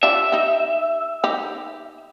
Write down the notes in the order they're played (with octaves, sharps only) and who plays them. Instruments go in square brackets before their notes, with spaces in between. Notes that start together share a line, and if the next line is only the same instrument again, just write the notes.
[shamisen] D4 F4 G4 [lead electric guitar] E5
[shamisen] D#4 G4
D#4 G4